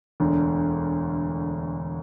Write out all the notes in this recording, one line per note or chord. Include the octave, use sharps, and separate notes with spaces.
E1 D2 D3